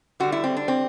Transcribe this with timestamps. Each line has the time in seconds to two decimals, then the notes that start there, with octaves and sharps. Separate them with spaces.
0.20 D3 G3 F#4
0.32 E4
0.44 C4
0.56 D4
0.68 C4